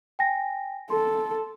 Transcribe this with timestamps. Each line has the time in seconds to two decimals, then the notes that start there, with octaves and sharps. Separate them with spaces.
0.19 G5 G#5 A#6
0.90 A4 C6